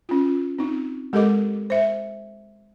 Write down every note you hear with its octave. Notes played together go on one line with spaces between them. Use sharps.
C#4 F4
C4 D#4
G#3 G4 A4 A#4 D#5 D6
C5 E5